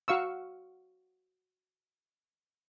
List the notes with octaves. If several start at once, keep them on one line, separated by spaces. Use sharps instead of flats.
F#4 F5 C#6 E6